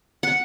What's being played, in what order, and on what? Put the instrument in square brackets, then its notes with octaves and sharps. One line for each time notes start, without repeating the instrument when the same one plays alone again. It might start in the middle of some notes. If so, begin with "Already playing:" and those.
[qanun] F#5